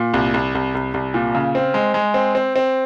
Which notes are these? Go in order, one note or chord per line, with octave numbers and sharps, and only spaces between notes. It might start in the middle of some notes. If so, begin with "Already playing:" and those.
Already playing: A#2
C2
C2
C2
C2
C2
A#2
C#3
C4
G#3
G#3
C4
C4
C4